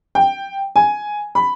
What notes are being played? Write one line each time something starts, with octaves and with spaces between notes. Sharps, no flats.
G5
G#5
B5